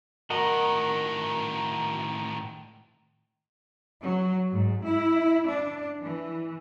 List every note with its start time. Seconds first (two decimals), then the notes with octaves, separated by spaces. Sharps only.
0.30 A2 D#3 F#4 A#4 D#5
4.03 F#3
4.52 G#2
4.87 E4
5.51 D4
6.00 E3